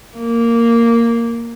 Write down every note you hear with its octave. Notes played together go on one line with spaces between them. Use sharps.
A#3